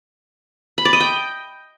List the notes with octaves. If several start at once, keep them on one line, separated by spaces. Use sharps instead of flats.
B5
D5
D#5
G5